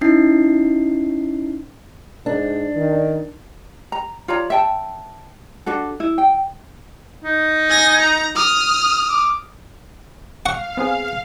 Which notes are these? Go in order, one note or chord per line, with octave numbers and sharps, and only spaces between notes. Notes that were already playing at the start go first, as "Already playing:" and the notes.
C#4 D#4 E4 C7
G#2 D4
D#3
A#5
F4 C#5 D5 A#5
E5 G5 A5
D4 F#4 A4
E4
G5
D#4
G#5 A#6
A#5
D#6 F6
D6
F5 F#5 C#6
B3 C4 G#4